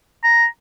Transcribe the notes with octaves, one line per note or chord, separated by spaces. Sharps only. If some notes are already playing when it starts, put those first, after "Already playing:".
A#5